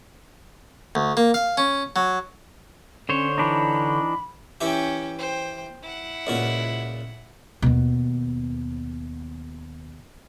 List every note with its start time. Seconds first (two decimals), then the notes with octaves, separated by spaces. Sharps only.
0.95 D2
1.17 A#3
1.34 F5
1.57 C#4
1.96 F#3
3.09 D3 C#4 C5 C#5
3.38 E3 D4 D#4 B5
4.61 E3 C#4 E4 G4 G5
5.18 C5 G5
5.83 E4 F#5
6.27 C#2 A#2 F#4
7.62 D#2 B2